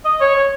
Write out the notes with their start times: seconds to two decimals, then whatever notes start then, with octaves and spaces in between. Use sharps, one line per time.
0.05 D#5
0.21 C#5
0.35 C#5